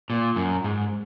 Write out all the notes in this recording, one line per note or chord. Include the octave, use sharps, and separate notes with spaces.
A#2
F#2
G#2